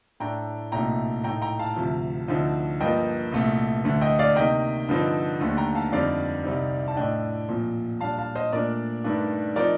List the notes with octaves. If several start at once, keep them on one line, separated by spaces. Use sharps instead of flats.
A2 A3 D4 G5 A#5
C2 A#2 A3 D#4 G5 A#5
A2 A3 D#4 G5 A#5
G5 A#5
F5 A5
D2 C3 F3
D2 D3 F3 C4 D#4
G2 F3 A#3 D#5 G5
C2 A#2 A3
D2 D3 A3
D#5 G5
D5 F5
C3 D#3 A#3 D#5 G5
G2 D3 F3 C4 D#4
D#2 D3 A3
G5 A#5
F5 A5
F2 D3 G3 C4 D#4 D5 F5
C2 C3 G3 C4 D#4
A5
A2 A3 D4 D#5 G5
A#2 F3 C4
A#2 G3 D4 F5 A5
F5 A5
C5 D#5
A#2 A3 D4 A#4 D5
G2 D#3 A3 D4
F3 C4 D#4 A#4 D5